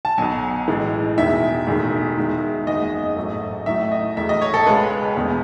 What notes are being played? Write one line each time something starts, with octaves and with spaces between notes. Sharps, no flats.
A5
B1 B2 F#3 G#5
A1 A2 E3 G#3
E1 E2 D#3 E5
E1 E2 D#3 A3
E2 D#3 G#3
F#1 E2 D#3 G#3 D#5
A1 G#2 D#3 F#3 A3
A1 A2 F#3 A3 E5
D#5
E1 E2 B2 A3 E5
D#5
C#5
A4
C#2 C#3 G#3 B4
E1 E2 B2